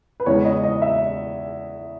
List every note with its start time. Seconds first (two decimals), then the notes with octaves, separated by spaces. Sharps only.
0.20 B4
0.26 E2 C#3 E3 G#3 C#5
0.45 D#5
0.64 D#5
0.82 E5